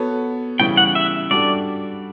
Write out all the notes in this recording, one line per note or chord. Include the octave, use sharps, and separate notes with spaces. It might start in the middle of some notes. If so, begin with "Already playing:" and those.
Already playing: B3 F#4 A4 C#5
C#3 E3 G3 C#4 G5
F#5
E5
G3 D4 F#4 A4 D5